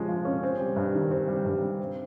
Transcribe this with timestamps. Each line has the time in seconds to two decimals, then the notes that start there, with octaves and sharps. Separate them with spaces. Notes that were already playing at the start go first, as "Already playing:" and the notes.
Already playing: F3 G#3 C#4
0.08 F4
0.25 C#4
0.43 C4
0.60 G3
0.76 G2
0.94 D#3
1.11 C4
1.28 G3
1.45 G2
1.62 G3
1.80 C4